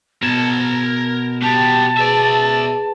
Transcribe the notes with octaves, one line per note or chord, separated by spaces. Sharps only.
B2 A#4 A5 G#6
B3 G4 A5
G#4 B4 D5 E5